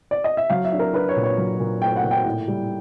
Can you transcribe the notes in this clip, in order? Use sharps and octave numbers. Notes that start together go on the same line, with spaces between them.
D5
D#5
E5
F#3 F5
E5
D4
A#4
D4 B4
C#5
A#2
C#5
F#3
A#2
A3 G5
F#5
A#2
G5
A2
G3